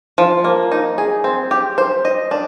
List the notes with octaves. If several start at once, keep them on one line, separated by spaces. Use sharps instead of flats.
F3
A#3
D#4
G#4
C4
G4
C5
D#5
D4